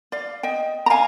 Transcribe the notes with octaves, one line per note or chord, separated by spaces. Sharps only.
D5 F5
D#5 G5
A#5
F5 G#5